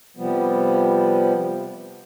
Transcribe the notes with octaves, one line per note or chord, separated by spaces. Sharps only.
C3 F3 G3 B3